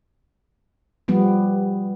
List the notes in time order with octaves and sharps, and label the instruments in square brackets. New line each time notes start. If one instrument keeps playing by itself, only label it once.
[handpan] F3 G3 B3